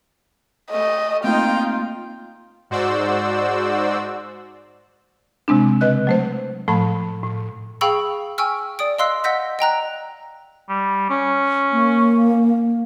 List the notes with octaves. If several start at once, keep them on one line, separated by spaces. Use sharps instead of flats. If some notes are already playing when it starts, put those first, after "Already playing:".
A3 D#5
A3 A#3 C4 D#4 F4 G5
G#2 F#4 C5 D5 E6
C3 G#3 C4 D4
C#3 B4 D#5 F#6
F#3 A3 C5
A2 F3 A3 A5 B5
A2
G#4 F5 G5 B5 C#6 E6
G5 G#5 C#6 E6 F6
D5 D#6 D7
D#5 F5 C6 E6 F#6 C7
D#5 F#5 E6 G6 A#6 B6
D#5 G5 A#5 F#6
G3
C#4
A#3